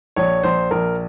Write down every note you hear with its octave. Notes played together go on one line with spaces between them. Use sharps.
A#1 C#5
A#1 C5
A#1 A#4